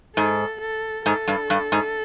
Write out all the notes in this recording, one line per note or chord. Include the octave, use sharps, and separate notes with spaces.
G#2 A4
A4
G#2 A4
G2
G2
G#2